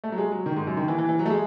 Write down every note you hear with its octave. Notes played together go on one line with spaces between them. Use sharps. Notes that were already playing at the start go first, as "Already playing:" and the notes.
A3
F#3
G#3
F#3
D#3
G#2
F#2
D#3
E3
E3
E3
F#3
A3
G#3